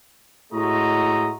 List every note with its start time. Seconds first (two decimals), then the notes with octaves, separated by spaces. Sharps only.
0.52 A2 G#3 A3 F#4 D#5 A#5